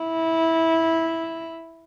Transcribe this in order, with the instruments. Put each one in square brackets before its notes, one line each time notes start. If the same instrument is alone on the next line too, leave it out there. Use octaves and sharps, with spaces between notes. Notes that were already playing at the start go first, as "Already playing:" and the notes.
Already playing: [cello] E4